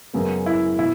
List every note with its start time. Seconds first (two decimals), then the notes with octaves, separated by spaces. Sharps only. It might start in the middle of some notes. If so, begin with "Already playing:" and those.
0.13 F#2 C#3 G#3 B3
0.46 E4
0.79 B2 E4